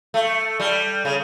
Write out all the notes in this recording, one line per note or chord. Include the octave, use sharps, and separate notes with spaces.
A3
G3
C#3